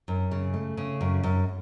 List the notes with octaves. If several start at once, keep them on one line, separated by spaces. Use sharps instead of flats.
F#2
C#3
A3
C#3
F#2
F#2